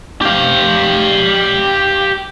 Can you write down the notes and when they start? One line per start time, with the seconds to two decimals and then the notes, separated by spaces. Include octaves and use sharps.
0.22 G4 F5